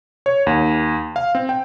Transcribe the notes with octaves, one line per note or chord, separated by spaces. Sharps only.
C#5
D#2
F5
C4
G5